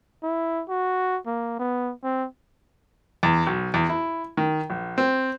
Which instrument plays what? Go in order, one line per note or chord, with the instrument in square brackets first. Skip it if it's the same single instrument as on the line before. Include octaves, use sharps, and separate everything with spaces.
[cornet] E4
F#4
A#3
B3
C4
[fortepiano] E2
B1
E2
E4
D#3
A#1
C4